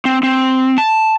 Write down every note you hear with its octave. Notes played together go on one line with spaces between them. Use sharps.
C4
C4
A5